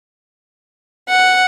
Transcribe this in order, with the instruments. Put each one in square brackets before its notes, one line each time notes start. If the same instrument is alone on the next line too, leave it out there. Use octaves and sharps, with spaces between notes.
[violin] F#5